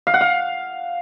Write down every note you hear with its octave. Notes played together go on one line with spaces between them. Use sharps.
F5
F#5
F5